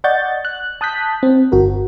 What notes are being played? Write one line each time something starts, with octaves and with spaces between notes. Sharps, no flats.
D5 D#5 F#5 C#6 G6 A6
F#6
A5 D#6 F#6 G6 B6
C4
G1 F#4 A#4